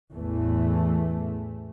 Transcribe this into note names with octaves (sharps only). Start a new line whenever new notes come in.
A1 E2 E3 A3